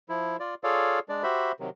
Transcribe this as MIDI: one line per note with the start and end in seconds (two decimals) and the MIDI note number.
0.09 0.36 53
0.09 0.36 64
0.40 0.54 65
0.40 0.54 74
0.64 0.99 65
0.64 0.99 68
0.64 0.99 69
0.64 0.99 73
0.64 0.99 74
0.64 0.99 77
1.09 1.23 56
1.09 1.23 62
1.09 1.23 74
1.23 1.52 66
1.23 1.52 67
1.23 1.52 72
1.23 1.52 76
1.23 1.52 83
1.60 1.70 48
1.60 1.70 51
1.60 1.70 54